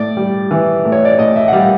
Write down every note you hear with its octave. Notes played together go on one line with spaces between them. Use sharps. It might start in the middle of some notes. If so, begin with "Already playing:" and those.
Already playing: A2 D5
G3
E3
A2
C#5
D5
A2 D#5
E5
F#5
G3 F5